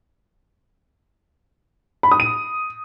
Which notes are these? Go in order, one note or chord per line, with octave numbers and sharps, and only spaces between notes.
B5
D#6
D#7